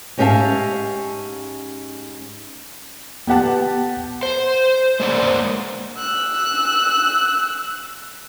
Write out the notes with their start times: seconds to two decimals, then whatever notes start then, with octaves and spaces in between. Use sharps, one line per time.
0.18 G#2 C#4 G4 E5 F5 A5
3.27 B3 G4 F#5 A5
4.23 C5
5.00 G#3 A#3 C5 D5 F#5
5.97 E6 F#6